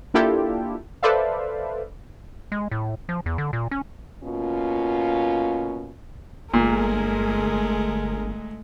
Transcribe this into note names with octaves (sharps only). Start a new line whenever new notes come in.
A#3 D4 E4 F4 G4 A4
A4 B4 C5 D5 E5 F5
G#3
A2
F3
E2
D3
A#2
C#4
B2 A#3 C#4 F4
G1 A#2 G#3 A3 G#4 A#4